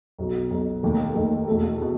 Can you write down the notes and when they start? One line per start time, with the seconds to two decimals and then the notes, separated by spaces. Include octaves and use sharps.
0.19 B1 B2 F#3
0.50 B1 B2 F#3
0.83 D#2 D#3 A3
1.15 D#2 D#3 A3
1.48 E2 B2 A3
1.82 B2